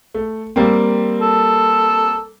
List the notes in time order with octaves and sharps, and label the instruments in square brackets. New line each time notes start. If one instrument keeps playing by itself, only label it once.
[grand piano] A3
G3 A#3 C4
[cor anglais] A4